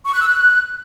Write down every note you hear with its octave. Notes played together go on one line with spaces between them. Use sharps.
C#6
F#6
E6
F#6